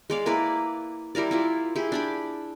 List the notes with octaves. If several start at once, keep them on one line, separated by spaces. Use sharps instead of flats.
G#3 D5 F5
A#3 E4 B4 D5
G3 E4 A#4 D5
E4 F4 D5
E4 G4 G#4
D4 D5 B5